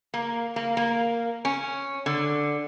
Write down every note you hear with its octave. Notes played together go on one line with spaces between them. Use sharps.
A#3
A#3
A#3
C#4
D3